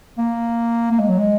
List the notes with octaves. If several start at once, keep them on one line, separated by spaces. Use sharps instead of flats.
A#3
A#3
G#3
F#3
G#3